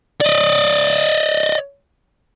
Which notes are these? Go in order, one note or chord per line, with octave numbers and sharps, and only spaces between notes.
D5 D#5